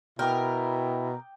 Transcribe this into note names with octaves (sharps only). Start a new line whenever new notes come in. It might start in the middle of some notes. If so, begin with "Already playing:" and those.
B2 E4 A#4 G5 D6 D#6